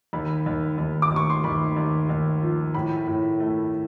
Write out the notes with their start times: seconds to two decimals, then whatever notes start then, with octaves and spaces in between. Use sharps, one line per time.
0.13 D#2 B5
0.46 D#2
0.78 D#2
1.02 D6
1.11 D#2
1.16 C#6
1.30 C6
1.44 D#2 B5
1.76 D#2
2.09 D#2
2.42 F3
2.74 A2 B5
3.07 A2
3.40 A3